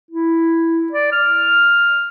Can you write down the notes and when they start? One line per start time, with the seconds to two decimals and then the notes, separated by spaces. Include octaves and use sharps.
0.11 E4
0.92 D5
1.12 F6